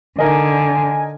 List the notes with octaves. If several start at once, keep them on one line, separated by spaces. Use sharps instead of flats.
D3 D#4 A#4 D#5 G#5